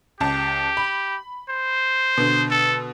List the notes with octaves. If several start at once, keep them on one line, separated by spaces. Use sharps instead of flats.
C#2 G4 A5
B5
C5
B2 D3
A4